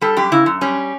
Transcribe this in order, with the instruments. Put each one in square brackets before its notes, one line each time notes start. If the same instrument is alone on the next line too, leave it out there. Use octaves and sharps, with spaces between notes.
[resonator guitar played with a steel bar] G3 A4
F#2 G4
C#3 E4
F#2
G3 C#4